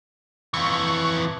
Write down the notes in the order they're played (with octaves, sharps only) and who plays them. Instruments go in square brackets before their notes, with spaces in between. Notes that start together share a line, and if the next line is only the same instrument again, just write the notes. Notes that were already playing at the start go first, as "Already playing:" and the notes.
[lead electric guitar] F2 E3 [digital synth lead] C#6